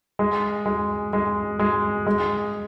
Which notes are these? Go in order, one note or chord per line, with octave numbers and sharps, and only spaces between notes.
G#3
G#3
G#3
G#3
G#3